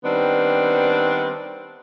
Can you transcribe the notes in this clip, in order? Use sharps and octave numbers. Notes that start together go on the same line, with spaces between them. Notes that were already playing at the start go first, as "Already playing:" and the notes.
D#3 G3 B3 C4 D4